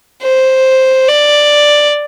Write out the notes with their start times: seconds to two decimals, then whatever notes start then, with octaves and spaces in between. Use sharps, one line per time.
0.22 C5
1.08 D5